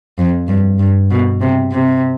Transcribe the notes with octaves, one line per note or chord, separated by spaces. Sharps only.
F2
G2
G2
B2
C3
C3